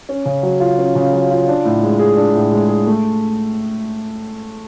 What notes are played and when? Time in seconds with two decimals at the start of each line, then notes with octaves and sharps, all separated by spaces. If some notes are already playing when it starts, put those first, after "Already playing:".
0.09 C#4
0.25 C#3
0.43 F#3
0.60 F4
0.78 C#4
0.95 C#3
1.13 F#3
1.30 F4
1.48 D4
1.65 A2
1.83 G#3
1.99 G#4
2.17 D4
2.34 A2
2.51 G#3
2.68 G#4
2.86 A3